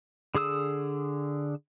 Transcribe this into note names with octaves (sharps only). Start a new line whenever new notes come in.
D3 G#4 D#6 E6